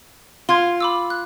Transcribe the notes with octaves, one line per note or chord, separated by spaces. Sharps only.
F4 C6 G#6
B5 D6 E6
F#6